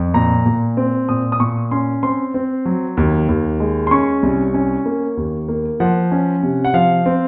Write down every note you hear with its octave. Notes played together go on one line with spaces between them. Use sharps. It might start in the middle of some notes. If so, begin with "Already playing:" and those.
Already playing: F2
A#2 A#5
A#2
C4
A#2 D#6
D#6
A#2 C#6
C#4 C6
C4 C6
C4
F#3
D#2
D#2
G#3
C6
C#4 C#6
C2
C#4
A#3
D#2
A#3
F3 F#5
C#4
C3
F#5
F3 F5
C4